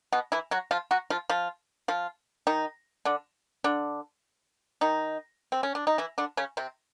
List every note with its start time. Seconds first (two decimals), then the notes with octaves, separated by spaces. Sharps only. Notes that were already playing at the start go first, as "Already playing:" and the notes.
0.13 B2 B3
0.32 E3 E4
0.51 F#3 F#4
0.71 F3 F4
0.91 F#3 F#4
1.10 F3 F4
1.30 F3 F4
1.88 F3 F4
2.47 D#3 D#4
3.05 D3 D4
3.64 D3 D4
4.81 D#3 D#4
5.52 C4
5.63 C#4
5.75 D4
5.87 D#4
5.98 E3 E4
6.18 D3 D4
6.37 C#3 C#4
6.57 C3 C4